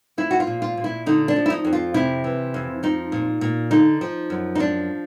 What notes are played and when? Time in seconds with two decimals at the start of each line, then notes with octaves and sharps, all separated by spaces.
0.18 F3 E4
0.31 F#4
0.40 F4
0.47 A#2
0.62 F4
0.77 A#2
0.84 E4
1.06 D3 D#4
1.28 D4
1.36 F3
1.46 E4
1.50 D#4
1.65 F2
1.73 F4
1.94 C3 E4
2.24 E3
2.54 F2
2.83 F3 D#4
3.12 A#2
3.41 A#2
3.71 D3 D#4
4.01 F3
4.30 F#2
4.55 D#4
4.59 F3 D4